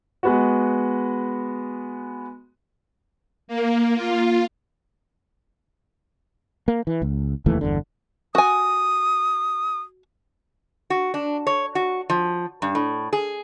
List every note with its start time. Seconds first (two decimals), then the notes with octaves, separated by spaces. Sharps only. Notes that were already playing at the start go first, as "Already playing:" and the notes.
0.23 G#3 B3 F#4
3.48 A#3
3.95 F4
6.68 A#3
6.87 E3
7.02 C#2
7.46 F1 D#2 E3 A3
7.61 G1 E2 D3
8.35 F#4 G#5 D#6
10.90 F#4
11.14 D4
11.47 C#5
11.75 F#4
12.10 F3
12.62 G2
12.75 A2
13.13 G#4